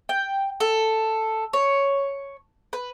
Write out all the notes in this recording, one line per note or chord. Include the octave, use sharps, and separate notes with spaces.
G5
A4
C#5
B4